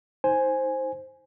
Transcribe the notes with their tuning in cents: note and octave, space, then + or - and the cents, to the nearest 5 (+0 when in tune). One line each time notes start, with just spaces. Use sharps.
D#4 +35 C5 +5 G#5 +0